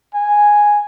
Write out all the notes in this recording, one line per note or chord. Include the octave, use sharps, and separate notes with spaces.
G#5